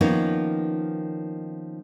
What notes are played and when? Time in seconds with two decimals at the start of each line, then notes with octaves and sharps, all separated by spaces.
0.01 D#3 F3 A#3 B3 C#4 D#4